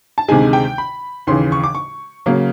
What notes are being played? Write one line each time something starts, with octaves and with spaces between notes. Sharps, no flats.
A5
D2 C3 D#3 G#3 G#5
G5
B5
D#2 C#3 E3 C6
C#6
D6
C#6
C#3 F#3 A#3